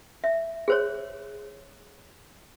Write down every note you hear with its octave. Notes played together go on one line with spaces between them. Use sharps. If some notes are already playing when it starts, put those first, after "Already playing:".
E5
G#4 C5 C#5